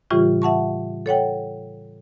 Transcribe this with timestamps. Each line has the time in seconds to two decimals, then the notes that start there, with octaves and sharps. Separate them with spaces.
0.11 A2 C#3 E3 G3 F4 G4
0.42 E5 F#5 A5 C#6
1.06 A4 C#5 F#5 G5